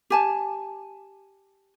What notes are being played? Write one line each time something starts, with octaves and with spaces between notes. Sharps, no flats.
G4 G#5 A5